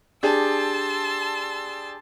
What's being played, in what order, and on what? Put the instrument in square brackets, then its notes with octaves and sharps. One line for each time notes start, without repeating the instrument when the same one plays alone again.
[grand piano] D4 G4 G#4 [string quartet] A5 C6 E6